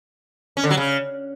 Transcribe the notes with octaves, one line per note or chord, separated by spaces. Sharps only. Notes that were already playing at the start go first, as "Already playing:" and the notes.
C#4
D3
F#3
C#3